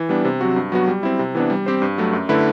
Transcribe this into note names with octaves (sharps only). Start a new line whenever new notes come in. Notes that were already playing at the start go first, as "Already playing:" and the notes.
Already playing: E3
G3 B3 D4
C3
F#3 C4 F#4
G2
F#3 B3 F#4
G3
C4 E4
C3
E3 B3 D4
G3
C4 G4 C5
G2
F#3 A3
F#2
D3 A3 E4 B4